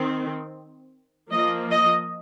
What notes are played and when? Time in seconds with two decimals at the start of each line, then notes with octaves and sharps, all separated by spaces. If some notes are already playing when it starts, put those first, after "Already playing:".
Already playing: D#3 C4
1.31 F3 A#3 D#5
1.71 D#5